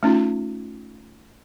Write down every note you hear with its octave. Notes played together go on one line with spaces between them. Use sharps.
A3 C#4 D#4 F4